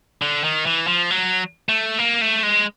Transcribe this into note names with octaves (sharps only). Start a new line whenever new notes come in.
D3
D#3
E3
F3
F#3
A3
A#3
A3
G#3